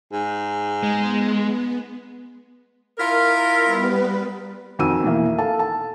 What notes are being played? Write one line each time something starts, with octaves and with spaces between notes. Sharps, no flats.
G#2
G#3 B3
E4 F4 A#4
G3 B3 B4
F2 D#3 F#4 G#5 E6 D#7
B2 E3 A#3
A4 F5 A5
A5